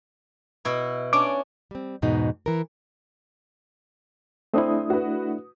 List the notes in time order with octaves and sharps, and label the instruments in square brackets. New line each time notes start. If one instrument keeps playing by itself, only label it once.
[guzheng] B2 E4
[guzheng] C#4 D4 [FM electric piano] D6
[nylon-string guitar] G3 C4
E2 G#2 B2 D#4
E3 A#4
[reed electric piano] A3 D4 E4 [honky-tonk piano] C4 D#6
[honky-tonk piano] F#4 B4